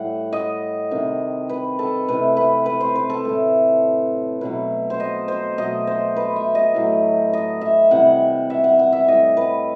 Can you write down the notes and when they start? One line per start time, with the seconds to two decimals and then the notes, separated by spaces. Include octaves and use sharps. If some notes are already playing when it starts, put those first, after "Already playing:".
Already playing: A2 G3 F#5
0.33 D#5
0.91 C3 D#3 G3
1.49 B4
1.79 A4
2.08 C3 E3 A3 B4
2.37 B4
2.66 B4
2.81 C5
2.95 B4
3.10 A4
3.25 A2 E3 A3
4.41 B2 F#3 A3 B4
4.90 C5
5.00 D#5
5.28 C5
5.58 B2 F#3 A3 D#5
5.87 C5
6.16 B4
6.36 E5
6.55 D#5
6.74 A2 F#3 A3
7.33 D#5
7.61 E5
7.91 C3 E3 G3 F#5
8.50 E5
8.64 F#5
8.79 F#5
8.93 E5
9.08 A2 G3 D#5
9.37 B4